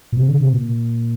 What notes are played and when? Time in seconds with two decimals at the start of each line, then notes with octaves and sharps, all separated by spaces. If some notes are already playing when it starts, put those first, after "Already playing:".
0.12 A#2
0.17 C3
0.28 D3
0.40 C3
0.53 A#2